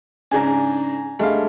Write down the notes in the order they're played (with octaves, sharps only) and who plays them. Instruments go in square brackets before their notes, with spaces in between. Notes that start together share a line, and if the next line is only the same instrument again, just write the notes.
[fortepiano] G#2 C#3 D4 [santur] G#5 A#5
[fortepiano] G2 F5 [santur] G#3 A3